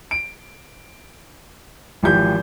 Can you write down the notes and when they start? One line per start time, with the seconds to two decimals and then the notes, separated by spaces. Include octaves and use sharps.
0.11 D7
2.03 G#1 E3 F3 G4 G6